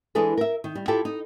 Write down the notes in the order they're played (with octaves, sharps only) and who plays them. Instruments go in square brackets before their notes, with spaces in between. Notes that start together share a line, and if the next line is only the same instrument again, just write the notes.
[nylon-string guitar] E3 G#3 D4 G#4 A4 B4
A#4 E5
D#3
G3
E4 F4 G4 A4 A5
D#4